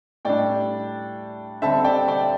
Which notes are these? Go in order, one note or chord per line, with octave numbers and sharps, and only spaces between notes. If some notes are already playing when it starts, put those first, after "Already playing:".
A2 G3 D4 D5 G5
D3 G3 C4 E5 A5
D5 G5
D5 G5